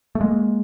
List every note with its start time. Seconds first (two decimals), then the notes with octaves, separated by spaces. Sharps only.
0.15 A3
0.21 G#3 A#3